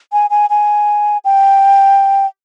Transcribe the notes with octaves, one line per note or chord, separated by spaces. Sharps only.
G#5
G#5
G#5
G5